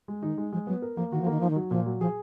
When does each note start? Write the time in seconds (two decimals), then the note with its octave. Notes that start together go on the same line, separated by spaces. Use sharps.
0.08 G#3
0.22 D#3 D#4
0.38 G#3
0.52 F3 G#3
0.67 F#3 B3
0.82 A#4
0.97 F3 A#3
1.12 D#3 F#4
1.21 F3
1.26 D#3 A#3
1.40 F3 D#4
1.50 D#3
1.56 F#3
1.70 A#2 F3
1.86 F#3
2.01 F3 G#4